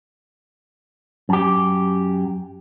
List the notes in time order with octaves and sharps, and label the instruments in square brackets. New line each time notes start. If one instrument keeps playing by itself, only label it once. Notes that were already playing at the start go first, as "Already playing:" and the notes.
[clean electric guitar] F#2 G4